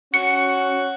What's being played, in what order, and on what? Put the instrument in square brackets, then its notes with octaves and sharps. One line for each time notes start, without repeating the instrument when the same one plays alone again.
[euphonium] C#4 [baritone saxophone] F#4 [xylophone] C#7